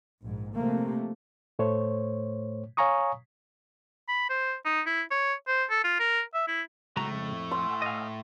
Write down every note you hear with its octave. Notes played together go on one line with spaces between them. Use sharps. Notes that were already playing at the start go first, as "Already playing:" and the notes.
A#1 G#2
C3 F3 A3 A#3
A2 A3 C5 C#5
C#5 F5 G#5 A#5 C#6 D#6
B5
C5
D#4
E4
C#5
C5
A4
F4
A#4
E5
E4
B1 A2 C#3 G#3 A3 F#4 A#5
F2
F#5 G#5 C6 E6
D#5 F5